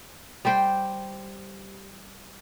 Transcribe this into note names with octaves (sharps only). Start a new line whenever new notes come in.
G3 G4 C5 G5